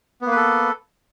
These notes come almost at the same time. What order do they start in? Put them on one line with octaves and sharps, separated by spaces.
B3 A#3 B4 A4